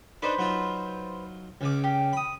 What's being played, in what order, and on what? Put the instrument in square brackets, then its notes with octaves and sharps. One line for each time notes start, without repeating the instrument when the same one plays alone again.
[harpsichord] D4 D#4 [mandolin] B4 C5
[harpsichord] F#3 D#4 F4
C#2 C#3 D6
[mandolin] G4
[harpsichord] B5 D#6